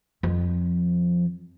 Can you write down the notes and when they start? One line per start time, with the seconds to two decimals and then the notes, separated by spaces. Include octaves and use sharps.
0.23 F2 F3